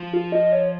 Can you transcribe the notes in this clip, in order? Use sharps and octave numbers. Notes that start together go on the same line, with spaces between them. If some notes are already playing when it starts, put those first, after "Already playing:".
Already playing: F3
F4
D#5
C#5